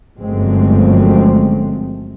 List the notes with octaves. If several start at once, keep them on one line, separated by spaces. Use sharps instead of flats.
G1 F#2 F3 G#3 A3 C4